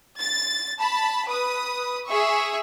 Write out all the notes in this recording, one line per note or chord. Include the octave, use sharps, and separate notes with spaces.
A6
A5 B5
B4 D#6
G#4 E5 C#6